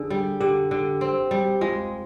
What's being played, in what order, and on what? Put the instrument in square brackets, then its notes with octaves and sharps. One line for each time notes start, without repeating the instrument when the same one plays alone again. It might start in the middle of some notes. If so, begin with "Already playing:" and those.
Already playing: [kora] D3 [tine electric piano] G#4
[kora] G3
[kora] D3 [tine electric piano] G4
[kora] D3
C4
G3
[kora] G#3 [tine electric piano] F4